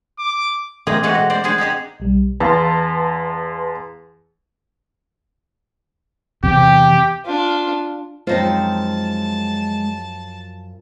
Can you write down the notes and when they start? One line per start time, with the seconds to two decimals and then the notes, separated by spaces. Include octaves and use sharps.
0.19 D6
0.87 E3 A3 A#3 C4 G#4 D#5
1.03 E3 G#3 C4 F#4 A4 B4
1.15 B2
1.30 C5 D5
1.44 B3 D4 G#4 C5
1.58 C4 D#4 G4 G#4
2.00 B1 G3
2.40 E2 B4 F5 A5 C6
6.43 E2 C3 G4
7.25 D4 F4
8.27 F#2 F3 G#3 C4 D#4 F4 C5 A5